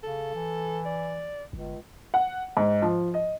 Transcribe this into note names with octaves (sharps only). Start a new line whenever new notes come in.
C#3 A4
E3
D5
G1 C#2
F#5
G#2
F3
D#5